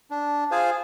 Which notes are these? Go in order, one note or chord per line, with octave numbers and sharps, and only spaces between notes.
D4
F4 G#4 C5 F5 G#5